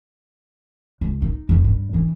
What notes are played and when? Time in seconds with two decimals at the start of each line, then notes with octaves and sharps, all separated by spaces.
1.01 C#2
1.22 D#4
1.49 F2 F3
1.64 G2
1.93 E3 D4